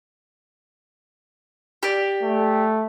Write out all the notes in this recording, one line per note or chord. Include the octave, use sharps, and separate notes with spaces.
G4 D5
A3